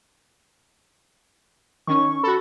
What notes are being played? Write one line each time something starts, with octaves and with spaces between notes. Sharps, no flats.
D#3 C#4 C#6
F#4 A4 B5